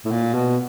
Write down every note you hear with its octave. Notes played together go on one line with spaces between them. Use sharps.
A2
A#2
B2